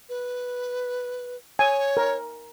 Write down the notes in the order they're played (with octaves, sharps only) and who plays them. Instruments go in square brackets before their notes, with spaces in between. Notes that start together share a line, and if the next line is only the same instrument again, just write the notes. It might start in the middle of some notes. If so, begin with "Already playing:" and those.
[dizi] B4
[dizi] C#5 [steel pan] G#5
[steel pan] A#4